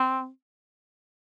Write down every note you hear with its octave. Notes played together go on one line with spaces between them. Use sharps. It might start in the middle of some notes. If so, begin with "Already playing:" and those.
Already playing: C4